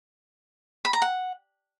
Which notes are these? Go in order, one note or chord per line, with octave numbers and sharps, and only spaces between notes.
B5
A#5
F#5